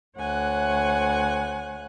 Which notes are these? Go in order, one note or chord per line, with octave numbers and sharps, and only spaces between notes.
D2 C#5 F#5 G#5 F#6